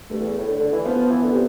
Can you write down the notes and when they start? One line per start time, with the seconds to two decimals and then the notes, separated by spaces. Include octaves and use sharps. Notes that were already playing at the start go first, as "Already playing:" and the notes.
0.10 G2 A3
0.19 E2
0.38 A2
0.48 D3
0.60 D3
0.72 E3
0.85 F3 B3
0.98 F3
1.10 E3
1.23 D3
1.32 C3